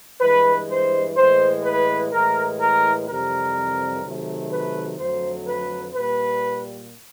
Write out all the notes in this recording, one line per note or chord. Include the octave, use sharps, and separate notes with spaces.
G2 E3 G#3 B4
C5
A2 E3 G#3 C5
B4
A2 E3 G#3 A#4
A#4
F2 C3 E3 G3 A#4
C3 D#3 F#3 A3
B4
F2 D3 F#3 A3 C5
B4
A#2 G3 B4